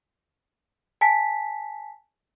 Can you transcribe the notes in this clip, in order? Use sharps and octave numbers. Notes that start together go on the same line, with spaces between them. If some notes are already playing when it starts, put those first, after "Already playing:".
G#5 A5 B6